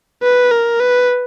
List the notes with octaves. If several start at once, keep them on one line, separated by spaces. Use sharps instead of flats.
B4
A#4
B4